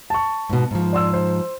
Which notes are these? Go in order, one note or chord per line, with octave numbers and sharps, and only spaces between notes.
A5 C#6
G#2 B2
G#2 F3
D5 C6 E6
C5